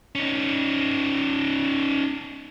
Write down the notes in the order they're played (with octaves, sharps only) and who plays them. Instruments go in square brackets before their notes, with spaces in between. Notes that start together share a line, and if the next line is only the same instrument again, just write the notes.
[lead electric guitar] C#4 D#4